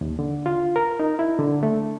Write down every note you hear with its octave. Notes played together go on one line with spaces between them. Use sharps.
D#2
D3
F4
A#4
D#4
E4
D3
A3